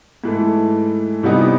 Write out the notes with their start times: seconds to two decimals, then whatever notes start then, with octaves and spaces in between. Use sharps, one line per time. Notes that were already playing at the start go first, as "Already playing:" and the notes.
0.24 G#2 E3 A3
1.23 C3 E3 G3 B3 D#4